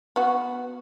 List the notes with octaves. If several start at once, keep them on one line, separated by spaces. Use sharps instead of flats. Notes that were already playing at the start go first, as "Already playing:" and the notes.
B3 F#4